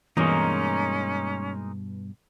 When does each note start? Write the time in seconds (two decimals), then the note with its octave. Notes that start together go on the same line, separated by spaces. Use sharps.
0.17 G2 B2 E3 G#3 A#3 C#4 D#4